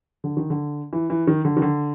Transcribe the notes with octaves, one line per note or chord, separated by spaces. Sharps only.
D3
D#3
D3
E3
E3
D#3
D3
D#3
D3